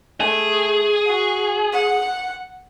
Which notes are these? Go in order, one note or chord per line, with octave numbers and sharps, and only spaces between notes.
A3 G#4
F#4
F#5